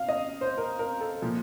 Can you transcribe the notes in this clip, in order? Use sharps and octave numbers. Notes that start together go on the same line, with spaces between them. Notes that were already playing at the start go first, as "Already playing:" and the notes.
Already playing: F5
D#5
C5
A#4
A#4
A4
A#2 F3